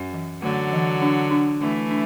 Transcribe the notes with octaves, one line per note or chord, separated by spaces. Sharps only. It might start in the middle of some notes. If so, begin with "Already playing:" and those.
Already playing: F#2
E3
D3 F#3 A3
E3
D4
D4
E3 A3 D4
D4